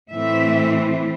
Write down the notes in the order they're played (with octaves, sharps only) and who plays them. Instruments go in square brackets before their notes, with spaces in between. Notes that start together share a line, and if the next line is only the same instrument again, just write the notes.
[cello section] A2 E3 A3 C4 E5